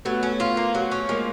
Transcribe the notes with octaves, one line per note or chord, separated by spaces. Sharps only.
F#3 A3 B3
C#4
F4
A#3
F#3
C#4
F3 G#3 A#3